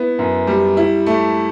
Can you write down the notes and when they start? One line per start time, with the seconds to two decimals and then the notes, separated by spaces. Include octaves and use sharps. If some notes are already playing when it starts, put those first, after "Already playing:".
Already playing: B3 E4
0.19 F#2
0.47 G3
0.77 E4
1.06 A3